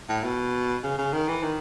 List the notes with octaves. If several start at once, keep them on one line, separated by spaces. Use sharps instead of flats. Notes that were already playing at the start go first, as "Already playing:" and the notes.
A2
B2
C#3
C#3
D#3
E3
D#3